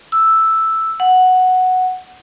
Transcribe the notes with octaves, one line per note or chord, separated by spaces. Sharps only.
E6
F#5